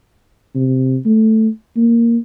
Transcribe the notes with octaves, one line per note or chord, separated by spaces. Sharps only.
C3
A3
A#3